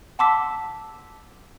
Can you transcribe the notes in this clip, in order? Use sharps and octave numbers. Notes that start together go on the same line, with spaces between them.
F#5 A5 C6 D6 E6 B6